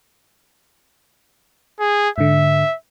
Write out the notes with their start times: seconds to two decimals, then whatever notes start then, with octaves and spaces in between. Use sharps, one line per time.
1.80 G#4
2.18 G#2 D3 E5